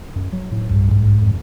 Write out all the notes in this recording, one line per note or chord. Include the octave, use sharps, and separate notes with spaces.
F#2
F#3
A2
B1 G2
G#2
F2